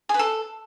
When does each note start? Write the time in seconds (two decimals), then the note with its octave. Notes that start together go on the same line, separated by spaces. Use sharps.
0.09 G#4
0.14 B4
0.19 A4